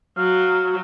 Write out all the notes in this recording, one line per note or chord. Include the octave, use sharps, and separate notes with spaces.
F#3 F5